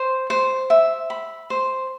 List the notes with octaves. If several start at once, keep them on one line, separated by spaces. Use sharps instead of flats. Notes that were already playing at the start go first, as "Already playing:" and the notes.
Already playing: C5
C5
E5
B5
C5